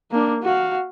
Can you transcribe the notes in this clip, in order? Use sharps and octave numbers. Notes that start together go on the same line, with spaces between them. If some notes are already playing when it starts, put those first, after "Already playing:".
A#3 D4
F#4 F5